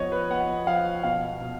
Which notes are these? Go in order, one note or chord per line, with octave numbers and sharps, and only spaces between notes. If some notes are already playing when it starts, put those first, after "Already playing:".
Already playing: F3 B3 C#5 D#5
B4
B3 F#5
F3 F5
B2 F5
B2